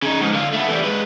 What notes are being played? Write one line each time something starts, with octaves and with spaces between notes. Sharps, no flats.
C#3 D#4
G#2 F3
D3 F4
A3 B3
E3 G3
G#3 B4